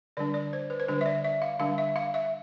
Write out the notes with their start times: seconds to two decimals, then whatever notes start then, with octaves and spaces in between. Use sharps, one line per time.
0.17 D3 G3 D4 D5
0.34 D5
0.53 C5
0.70 B4
0.80 C5
0.88 D3 G3 D4 B4
1.01 E5
1.06 D5
1.24 E5
1.42 F5
1.59 D3 G3 D4 F5
1.78 E5
1.96 F5
2.14 E5